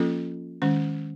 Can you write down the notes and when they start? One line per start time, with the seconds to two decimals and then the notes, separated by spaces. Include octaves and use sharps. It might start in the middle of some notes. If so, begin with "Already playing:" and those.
Already playing: F3 A#3 C#4 F4 A4
0.62 D#3 G#3 C#4